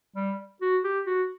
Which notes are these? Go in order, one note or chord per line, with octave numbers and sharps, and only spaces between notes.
G3
F#4
G4
F#4